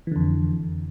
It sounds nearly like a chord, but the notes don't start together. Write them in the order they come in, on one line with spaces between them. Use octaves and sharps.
E3 D3 F2